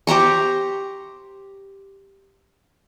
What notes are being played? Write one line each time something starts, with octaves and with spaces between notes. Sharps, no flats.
G4 C5 A#5 C#6